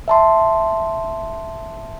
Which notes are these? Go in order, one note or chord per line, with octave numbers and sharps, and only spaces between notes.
E5 A5 C6